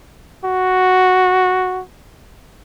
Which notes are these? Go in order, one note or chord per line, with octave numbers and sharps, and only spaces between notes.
F#4